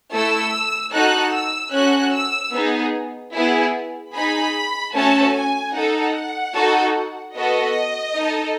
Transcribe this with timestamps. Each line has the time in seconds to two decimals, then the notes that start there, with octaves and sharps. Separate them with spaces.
0.13 A3 E4 A4 E6
0.93 D#4 F#4 A4 F#6
1.34 E6
1.73 C#4 F#4 A4 F#6
2.14 E6
2.53 B3 D#4 G#4
3.35 B3 E4 G#4
4.15 D#4 G#4 B5
4.94 A3 C#4 F#4 A4 A5
5.35 G#5
5.75 D#4 A4 F#5
6.55 D#4 F#4 A4
7.36 B3 F#4 A4 D#5
8.16 D#4 A4